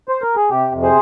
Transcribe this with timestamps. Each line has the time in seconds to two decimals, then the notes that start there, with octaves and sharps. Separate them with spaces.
0.09 C5
0.22 A#4
0.36 G#4
0.50 C3 G4
0.72 F2
0.82 G#4 C5